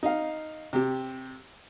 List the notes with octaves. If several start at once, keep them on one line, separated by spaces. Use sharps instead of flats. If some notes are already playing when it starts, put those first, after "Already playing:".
D#4 F5
C3 G4